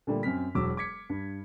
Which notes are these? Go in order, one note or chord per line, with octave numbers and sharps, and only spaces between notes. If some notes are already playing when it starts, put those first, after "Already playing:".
A#2 D3 G3 A3
F#2 C4 F6 B6
E1 F#3 D6 E6
D6 G#6 B6 C#7
G2